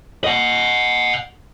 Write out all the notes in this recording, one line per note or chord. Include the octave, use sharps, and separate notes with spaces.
D#5 F#5